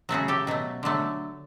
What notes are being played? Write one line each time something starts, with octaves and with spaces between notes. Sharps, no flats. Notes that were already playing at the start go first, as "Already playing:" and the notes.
C#3 F#3 A3 F#4 G#4
G4 A4
B2 F#3 A3
D3 F#3 A3